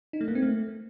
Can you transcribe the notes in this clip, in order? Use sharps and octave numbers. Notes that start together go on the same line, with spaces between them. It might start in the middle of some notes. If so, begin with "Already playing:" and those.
D#4
A3
A#3
C4
A3